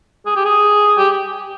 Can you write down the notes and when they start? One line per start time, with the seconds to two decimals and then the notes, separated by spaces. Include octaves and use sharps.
0.26 G#4
0.36 G4
0.45 G#4
0.98 G4